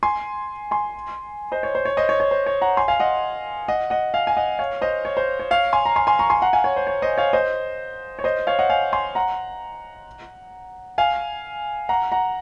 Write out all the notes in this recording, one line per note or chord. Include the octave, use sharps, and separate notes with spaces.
G#5 C6
G#5 C6
C5 D#5
C#5
C5
C#5
C5 D#5
C#5
C#5
C5
C#5
F#5 A#5
G#5 C6
F5 G#5
D#5 F#5
D#5 F#5
D#5 F#5
F5 G#5
G#5
D#5 F#5
C#5 F5
C5 D#5
C#5
C5
C#5
C#5 F5
G#5 C6
A#5
G#5 C6
G#5 C6
A#5 C#6
G#5 C6
F#5 A#5
F5 G#5
C#5
C5
C#5
C5 D#5
C#5 F5
C5 D#5
C#5
C5 D#5
C#5 F5
D#5 F#5
F5 G#5
G#5 C6
F#5 A#5
F5 G#5
F#5 A#5
F#5 A#5